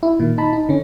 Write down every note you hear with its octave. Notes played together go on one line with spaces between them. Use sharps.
E4
A#2 D#3
D#4 A5 B5
D#4
D3 C#4